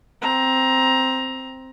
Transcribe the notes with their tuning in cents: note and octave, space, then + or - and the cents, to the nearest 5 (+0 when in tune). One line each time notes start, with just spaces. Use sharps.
C4 +0 A#5 +15